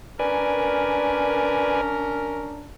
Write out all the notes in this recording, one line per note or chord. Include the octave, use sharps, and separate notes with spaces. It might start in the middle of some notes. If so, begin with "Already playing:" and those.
C#4 D4 A#4 B4 D5 G#5